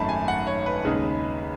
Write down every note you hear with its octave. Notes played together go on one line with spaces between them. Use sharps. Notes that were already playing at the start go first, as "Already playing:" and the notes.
Already playing: G#1 F#2 D#3 A3 A5 B5
G#5
F#5
C#5
B4
D#2 C#3 G#3 D#4